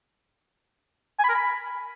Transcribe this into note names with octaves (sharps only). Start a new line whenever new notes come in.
G#5
B5
A#4
B5